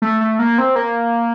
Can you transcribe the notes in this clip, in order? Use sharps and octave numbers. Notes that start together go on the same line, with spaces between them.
A3
A3
A#3
C4
A#3